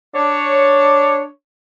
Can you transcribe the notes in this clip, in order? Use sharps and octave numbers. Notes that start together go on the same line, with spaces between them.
D4 C#5